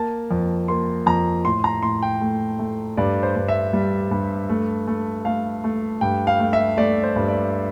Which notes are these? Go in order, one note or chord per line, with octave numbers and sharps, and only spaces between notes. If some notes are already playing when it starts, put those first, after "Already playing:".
Already playing: A#3 A5
F2
A#3 C6
F2 A#5
A2 C6
A#5
A2 C6
G5
A3
A3
G2 D5
C5
G2
E5
G3
G2
A3
A3
A3 F5
A3
G2 G5
F5
A3
E5
A3 D5
C5
G2
D5